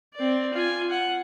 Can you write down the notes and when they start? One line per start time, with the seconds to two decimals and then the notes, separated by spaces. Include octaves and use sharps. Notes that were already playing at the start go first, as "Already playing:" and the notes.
0.14 C4 D5
0.53 F4 G#5
0.90 F#5